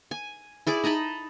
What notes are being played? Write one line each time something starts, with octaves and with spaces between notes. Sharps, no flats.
G#5
E4 G#4 D5 D6
D#4 D#5 A5 B5